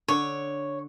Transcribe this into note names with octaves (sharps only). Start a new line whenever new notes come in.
D3 C#5